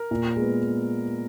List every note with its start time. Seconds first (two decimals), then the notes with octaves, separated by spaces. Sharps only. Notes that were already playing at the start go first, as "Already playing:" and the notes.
Already playing: A#4
0.11 A#2
0.36 G#3 B3